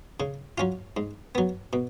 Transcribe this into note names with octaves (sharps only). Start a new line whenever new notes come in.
C#3
F#3 C#4 F4
G#2
F#3 B3
B2